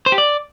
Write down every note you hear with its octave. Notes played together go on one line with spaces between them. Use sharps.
C5
G4
D5